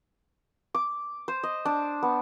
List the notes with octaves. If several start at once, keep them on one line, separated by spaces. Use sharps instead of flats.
D6
C5
D#5
D4
B3